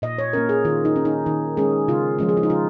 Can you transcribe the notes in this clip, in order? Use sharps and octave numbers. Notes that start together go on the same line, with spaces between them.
A#2 D#5
C#5
A#3 C#4 A#4
G#4
D#3 F4
D#4
C#4
D#4
D#3
G#3 C#4 G#4
C#3 F4
F3 G#3 C#4
G#4
F4
D#4
C#3 F4